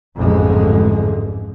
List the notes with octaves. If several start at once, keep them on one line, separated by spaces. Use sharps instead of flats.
A1 F2 G#2 D3 G#3